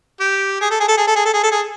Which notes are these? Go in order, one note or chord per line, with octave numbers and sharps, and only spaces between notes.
G4
G#4
A4
G#4
A4
G#4
A4
G#4
A4
G#4
A4
G#4